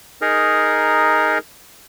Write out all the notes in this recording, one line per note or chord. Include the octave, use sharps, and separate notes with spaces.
D#4 G#4 A#4